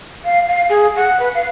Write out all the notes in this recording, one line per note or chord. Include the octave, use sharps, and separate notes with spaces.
F5
F5
G#4
F#5
B4
F5